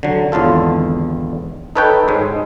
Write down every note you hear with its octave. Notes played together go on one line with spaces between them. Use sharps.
D3 F#3
G#1 E2 D3 F4 A4
D#4 A4 B4 C#5 G5
G#2 G#3